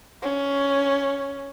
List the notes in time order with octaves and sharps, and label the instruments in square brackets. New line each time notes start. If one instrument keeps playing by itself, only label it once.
[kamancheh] C#4